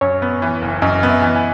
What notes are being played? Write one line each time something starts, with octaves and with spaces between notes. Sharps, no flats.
F#2 C#5
B3
E3
F#1
F#2 D#5
B3
E5
E3
G#5